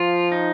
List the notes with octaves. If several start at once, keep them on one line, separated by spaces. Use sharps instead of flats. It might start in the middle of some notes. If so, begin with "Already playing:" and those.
Already playing: F3 F4
D#4